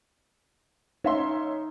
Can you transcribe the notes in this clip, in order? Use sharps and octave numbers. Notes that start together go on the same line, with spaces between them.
C#4 D#4 E5 C6